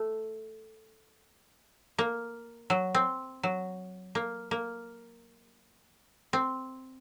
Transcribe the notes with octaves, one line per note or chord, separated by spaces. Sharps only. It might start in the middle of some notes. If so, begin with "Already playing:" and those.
Already playing: A3
A#3
F#3
C4
F#3
A#3
A#3
C4